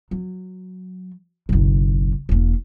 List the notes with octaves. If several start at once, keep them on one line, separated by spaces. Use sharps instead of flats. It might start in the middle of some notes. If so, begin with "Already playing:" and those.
F#3
F#1 B1
E1 A#3